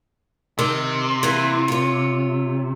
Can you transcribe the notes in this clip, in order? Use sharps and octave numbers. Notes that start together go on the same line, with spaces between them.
C3 D#3
E3 A#3 B3
F4 C#5